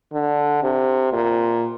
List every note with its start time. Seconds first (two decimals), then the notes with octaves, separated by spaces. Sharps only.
0.13 D3
0.63 C3
1.13 A#2